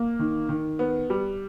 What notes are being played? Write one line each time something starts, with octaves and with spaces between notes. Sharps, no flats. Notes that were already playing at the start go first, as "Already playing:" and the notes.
Already playing: A#3
D#3
D#3
B3
G3